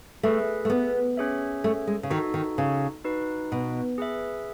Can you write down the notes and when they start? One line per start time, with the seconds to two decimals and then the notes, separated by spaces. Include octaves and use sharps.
0.23 A3 G#4 B4 E5
0.65 A3
0.70 B3
1.17 C#4 G#4 C#5 E5
1.64 A3
1.87 G#3
2.03 C#3
2.10 D#3 D#4 F#4 A4
2.34 D#3
2.58 C#3
3.04 D#4 F#4 B4
3.52 B2
3.98 G#4 B4 E5